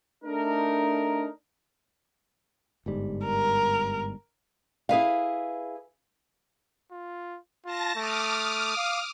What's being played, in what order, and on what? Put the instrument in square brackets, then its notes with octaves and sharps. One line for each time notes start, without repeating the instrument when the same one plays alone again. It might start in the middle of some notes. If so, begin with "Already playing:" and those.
[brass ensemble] A3 D4 D#4 A#4
[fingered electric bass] G1 G#2 G3
[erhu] A#4
[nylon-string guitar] E4 G#4 B4 F5
[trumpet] F4
[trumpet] F4 [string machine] A5 A#6
[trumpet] A3 [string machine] D6 D#6 F6
[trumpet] F5